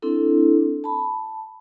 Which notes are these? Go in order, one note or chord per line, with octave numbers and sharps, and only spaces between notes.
C4 D4 E4 A4
A5 B5